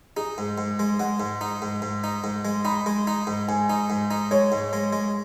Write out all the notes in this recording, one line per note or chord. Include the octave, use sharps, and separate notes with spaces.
D#4 G#4
G#2
G#2
G#3
G#3 F#5
G#2
D#4
G#2
G#2
D#4
G#2
G#3
D#4 B5
G#3
D#4
G#2
G#2 G#5
D#4
G#2
D#4
G#3 C#5
G#2
G#3
G#3